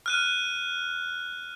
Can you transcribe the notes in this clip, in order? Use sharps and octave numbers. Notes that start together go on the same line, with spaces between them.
F6 F#6 D#7